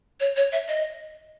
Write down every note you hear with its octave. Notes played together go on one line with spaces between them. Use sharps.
C#5
C#5
E5
D#5